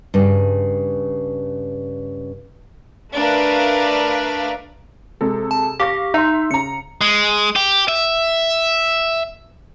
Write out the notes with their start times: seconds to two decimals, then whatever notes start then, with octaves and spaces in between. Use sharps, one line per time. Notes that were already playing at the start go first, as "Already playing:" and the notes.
0.14 G2 C#3
3.13 A3 D4 A#4 B4 F5
5.21 C3 G#3 A4
5.51 A5
5.80 G4 F5 C#6 A#6
6.14 D#4 E5 C6
6.51 C#3 A#5 C#7
7.01 G#3
7.56 G4
7.88 E5